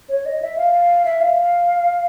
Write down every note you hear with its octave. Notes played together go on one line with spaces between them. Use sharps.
C#5
D#5
E5
F5
E5
F5